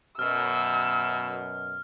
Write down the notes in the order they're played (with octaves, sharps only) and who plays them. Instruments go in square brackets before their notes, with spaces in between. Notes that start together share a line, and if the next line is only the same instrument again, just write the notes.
[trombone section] F#2 B2 [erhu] E6 [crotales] F6